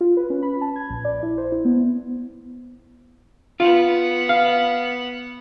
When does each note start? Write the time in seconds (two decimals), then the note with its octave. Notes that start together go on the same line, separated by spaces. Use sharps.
0.01 F4
0.17 B4
0.30 C#4
0.42 B5
0.61 A5
0.76 G#6
0.90 A#1
1.05 D5
1.23 E4
1.38 C5
1.52 E4
1.65 B3
3.60 B3 F4 F#5
4.29 F5